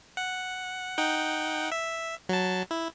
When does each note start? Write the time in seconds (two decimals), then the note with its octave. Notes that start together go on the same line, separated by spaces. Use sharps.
0.17 F#5
0.98 D#4 F#5 G5
1.72 E5
2.29 F#3 A5
2.71 E4